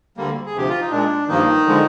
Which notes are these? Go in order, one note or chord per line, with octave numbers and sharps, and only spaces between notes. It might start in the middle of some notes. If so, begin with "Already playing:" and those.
D2 D3 G3 A#3
G#4
D2 C3 F3 G4
F4
D#4
A#2 G#3 D4
G2 D#3 F3 A#3 D#4
D3 F3 G#3